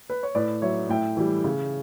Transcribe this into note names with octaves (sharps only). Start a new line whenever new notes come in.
B4
C#5
A2 B4 D5
F#3 C#5 E5
A2 E5 G5
E3 G3
C#3